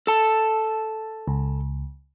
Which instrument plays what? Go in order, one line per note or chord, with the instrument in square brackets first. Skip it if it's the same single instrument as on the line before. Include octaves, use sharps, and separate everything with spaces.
[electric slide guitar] A4 A5
[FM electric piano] C#2